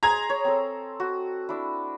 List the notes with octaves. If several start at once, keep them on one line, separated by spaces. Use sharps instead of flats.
G#4 D#5 A#5 C6 G#6
C#5
C4 A4
F#4
D4 E4